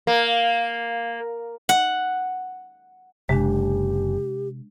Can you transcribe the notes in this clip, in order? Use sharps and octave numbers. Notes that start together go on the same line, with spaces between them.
A#3
F#5
F#1 C3 G#3 D4 G4